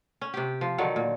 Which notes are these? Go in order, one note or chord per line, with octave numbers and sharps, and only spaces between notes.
C#4
C3 G4
F3
D3 D#3 F#3
A#2